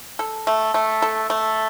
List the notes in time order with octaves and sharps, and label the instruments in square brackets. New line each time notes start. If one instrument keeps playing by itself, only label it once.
[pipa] A4
A3
A3
A4
A3